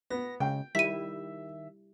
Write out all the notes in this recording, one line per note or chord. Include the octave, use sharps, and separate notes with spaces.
B3 A#6
C#3 G#3 G5
D#3 G3 E4 E5 B6 D#7